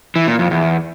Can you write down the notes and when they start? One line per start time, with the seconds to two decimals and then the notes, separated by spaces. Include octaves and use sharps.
0.16 E3
0.27 A#2
0.39 F2
0.51 E2